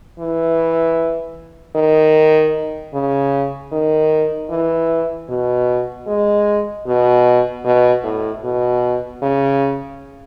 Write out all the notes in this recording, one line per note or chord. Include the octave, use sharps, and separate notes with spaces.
E3
D#3
C#3
D#3
E3
B2
G#3
B2
B2
A2
B2
C#3